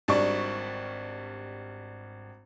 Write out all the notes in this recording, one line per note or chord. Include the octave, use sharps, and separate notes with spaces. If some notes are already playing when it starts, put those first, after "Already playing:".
G#1 G3 D4 C#6